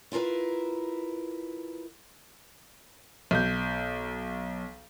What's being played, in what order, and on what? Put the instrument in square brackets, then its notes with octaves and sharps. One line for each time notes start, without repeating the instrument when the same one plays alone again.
[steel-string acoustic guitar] E4 F4 G#4 A#4 B4
[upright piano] B1 G6